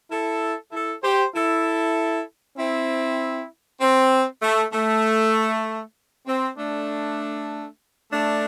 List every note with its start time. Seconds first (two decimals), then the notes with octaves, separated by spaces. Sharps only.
0.10 E4 A4
0.72 E4 A4
1.03 G4 C5
1.34 E4 A4
2.57 C4 E4
3.80 C4
4.42 A3
4.72 A3
6.27 C4
6.57 A3 D4
8.12 A3 D4